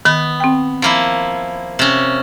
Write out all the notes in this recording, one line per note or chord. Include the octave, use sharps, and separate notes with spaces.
D#3 B3
C4 G5
F3 A#3 E4
C3 C#4